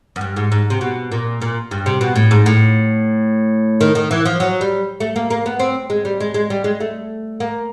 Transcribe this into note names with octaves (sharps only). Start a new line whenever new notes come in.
F#2
G2
G#2
G#2
C3
B2
A#2
A#2
G2
C3
B2
A2
G#2
A2
D#3
D#3
E3
F3
F#3
G3
A3
A#3
A#3
B3
C4
G#3
G3
G#3
G#3
G3
G#3
A3
A#3